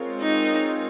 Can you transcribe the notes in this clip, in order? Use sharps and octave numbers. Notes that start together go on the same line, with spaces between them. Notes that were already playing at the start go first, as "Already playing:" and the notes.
Already playing: G#3 C4 F4 A#4 C#5
D#4